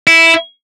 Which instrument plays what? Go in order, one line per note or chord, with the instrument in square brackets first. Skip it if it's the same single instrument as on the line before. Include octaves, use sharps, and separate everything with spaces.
[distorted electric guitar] E4